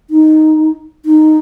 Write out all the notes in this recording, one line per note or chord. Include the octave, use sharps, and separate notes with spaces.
D#4
D#4